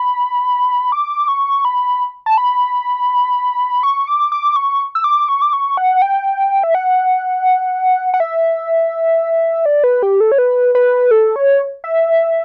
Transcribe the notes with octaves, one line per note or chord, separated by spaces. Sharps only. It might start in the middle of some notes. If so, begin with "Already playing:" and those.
Already playing: B5
D6
C#6
B5
A5
B5
C#6
D6
D6
C#6
E6
D6
C#6
D6
C#6
F#5
G5
E5
F#5
F#5
E5
D5
B4
G4
A4
C#5
B4
B4
A4
C#5
E5